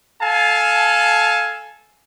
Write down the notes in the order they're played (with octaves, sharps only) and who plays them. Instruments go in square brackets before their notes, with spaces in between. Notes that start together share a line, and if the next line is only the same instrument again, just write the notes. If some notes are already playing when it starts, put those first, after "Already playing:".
[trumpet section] A4 F5 G#5 A5